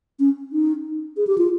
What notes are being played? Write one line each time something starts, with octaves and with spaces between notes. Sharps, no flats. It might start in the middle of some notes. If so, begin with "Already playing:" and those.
C#4
D#4
G#4
G4
F4